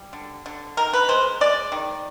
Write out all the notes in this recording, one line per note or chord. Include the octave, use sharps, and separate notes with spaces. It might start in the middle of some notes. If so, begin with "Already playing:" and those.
Already playing: G3
D3
D3
D#3 A#4
B4
G#3 C5
G#3 D5
D#3